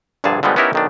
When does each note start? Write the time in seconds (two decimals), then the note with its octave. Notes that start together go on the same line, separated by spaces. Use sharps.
0.24 A#1 G2 A#2 D3 G#4 A5
0.43 D3 F3 G3 G#3 B3
0.56 B3 C#4 D#4 E4 G4 A#4
0.73 B1 D#3 D4